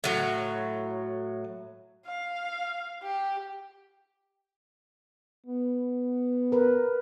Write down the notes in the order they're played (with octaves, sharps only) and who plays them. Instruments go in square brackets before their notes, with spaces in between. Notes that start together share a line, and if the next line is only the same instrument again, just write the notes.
[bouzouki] A2 F#3
[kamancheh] F5
G4
[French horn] B3
[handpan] A#4 B4